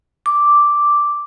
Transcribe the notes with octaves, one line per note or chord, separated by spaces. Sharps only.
D6